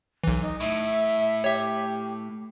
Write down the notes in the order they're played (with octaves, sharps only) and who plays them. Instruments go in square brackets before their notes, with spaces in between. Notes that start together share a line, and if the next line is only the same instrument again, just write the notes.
[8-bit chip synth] B1 E3
[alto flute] D#4
[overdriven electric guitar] A2 [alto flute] E5
[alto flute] G4 [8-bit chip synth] C#5 E5